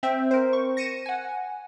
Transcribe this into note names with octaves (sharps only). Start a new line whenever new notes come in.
C4 E5 G5
A#4 C5
C#6
A#6 C#7 D#7 E7
F#5 G#5